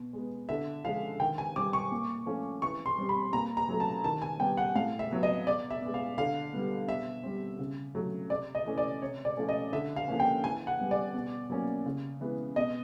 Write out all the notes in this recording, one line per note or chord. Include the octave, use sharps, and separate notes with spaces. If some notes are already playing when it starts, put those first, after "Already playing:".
Already playing: B2
G#3 B3
D3 E5
F3 G#3 F5
D#3 G5
G#5
G3 C4 D6
C#6
A#2
F3 A3 C#4
E3 C#6
C6
G3 C4
B5
A#2 A#5
A#5
F#3 A3
A5
D#3 A5
G#5
G3 B3 G5
F#5
A2 F5
E5
F#3 B3
D#5
B2 D5
E5
G#3 B3
F5
D3 F5
G3 B3
B2 E5
G3 C4
C#3
F#3 A3
C3 D5
D#5
E3 A3 C#4
D5
C3 C#5
D5
F3 A3 C#4
D#5
D3 E5
F5
F3 A#3 C#4
G5
E3 G#5
F#5
G3 B3
D5
B2
F#3 A#3 C#4
C#3
E3 G#3 B3
B2 D#5